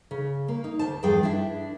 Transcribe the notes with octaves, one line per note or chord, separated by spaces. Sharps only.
C#3
A#3
D#4
D2 C5 A5
E2 G2 F3 G#4 A4 G5
D4 E4